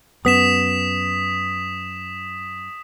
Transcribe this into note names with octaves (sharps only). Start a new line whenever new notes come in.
F#2 B3 D#6 B6 E7